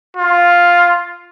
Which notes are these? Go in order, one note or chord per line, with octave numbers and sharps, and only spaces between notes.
F4